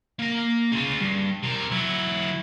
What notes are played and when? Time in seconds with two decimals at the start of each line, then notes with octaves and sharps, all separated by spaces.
0.19 A#3 A#5
0.72 C#3 F4
1.00 G2
1.43 C3 A#4
1.72 F#3 E4